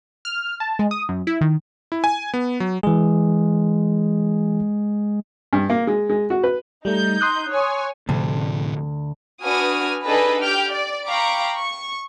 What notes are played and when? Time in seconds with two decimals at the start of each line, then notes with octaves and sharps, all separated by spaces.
0.25 F6
0.60 A5
0.79 G#3
0.91 D#6
1.09 F#2
1.27 E4
1.41 D#3
1.92 E4
2.04 G#5
2.34 B3
2.60 F#3
2.83 E3 G#3 G#4
5.53 G2
5.70 A#3
5.87 G#3
6.09 G#3
6.30 F#4
6.44 B4
6.85 G3 A3 D#4 G6
7.21 C6 D#6 F#6
7.50 C#5 G#5
8.09 D2 A2 C3 F3
9.44 D4 F#4 B4 G#5 D#6 F6
10.07 D4 D#4 G#4 A4 B4 D#5
10.41 G4 G5 F6 G6
10.71 D5
11.07 F5 G5 A#5 B5 C#6 D6
11.56 C#6